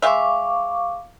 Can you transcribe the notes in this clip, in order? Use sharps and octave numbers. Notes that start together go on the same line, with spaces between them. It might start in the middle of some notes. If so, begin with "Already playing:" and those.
G#3 E5 F5 C#6 D6